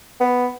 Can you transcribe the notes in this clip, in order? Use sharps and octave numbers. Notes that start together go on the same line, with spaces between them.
B3